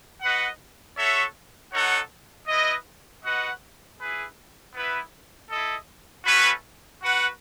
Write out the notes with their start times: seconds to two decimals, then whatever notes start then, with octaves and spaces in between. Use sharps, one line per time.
0.21 F#4 B4 D#5 F#5
0.96 F#4 A4 C#5 E5
1.72 D#4 A4 C#5 F#5
2.48 E4 B4 D#5
3.23 F#4 B4 D#5 F#5
3.98 E4 G#4 B4
4.73 B3 E4 B4 E5
5.48 E4 A4 D#5
6.24 A3 C#4 F#4 B4
7.00 F#4 B4 F#5